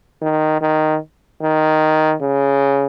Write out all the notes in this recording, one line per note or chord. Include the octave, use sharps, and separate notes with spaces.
D#3
D#3
D#3
C#3